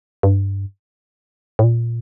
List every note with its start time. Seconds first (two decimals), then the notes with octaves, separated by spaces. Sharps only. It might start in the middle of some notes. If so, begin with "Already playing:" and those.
0.23 G2
1.59 A2
1.64 A#2